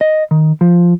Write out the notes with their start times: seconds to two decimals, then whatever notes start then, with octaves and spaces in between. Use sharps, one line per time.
0.01 D#5
0.31 D#3
0.61 F3